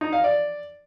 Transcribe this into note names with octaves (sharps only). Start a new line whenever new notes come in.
D#4
F5
D5